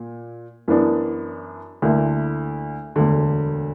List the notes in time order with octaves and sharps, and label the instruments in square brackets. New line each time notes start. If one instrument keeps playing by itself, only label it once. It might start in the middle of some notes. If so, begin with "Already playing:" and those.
Already playing: [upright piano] A#2
F#2 E3 B3 D4
D2 D3 A#3 E4
E1 D2 D3